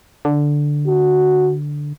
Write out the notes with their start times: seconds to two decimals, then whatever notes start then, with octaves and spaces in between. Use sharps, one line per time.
0.25 D3
0.87 F#4